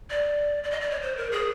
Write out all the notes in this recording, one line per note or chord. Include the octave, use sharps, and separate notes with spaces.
D5
D5
D#5
D5
C#5
C5
A#4
G#4